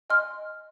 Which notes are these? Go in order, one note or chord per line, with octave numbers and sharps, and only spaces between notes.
D#5 G#5 C6 F6